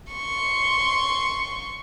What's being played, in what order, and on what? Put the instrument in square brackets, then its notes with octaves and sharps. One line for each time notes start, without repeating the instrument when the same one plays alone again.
[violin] C6 C#6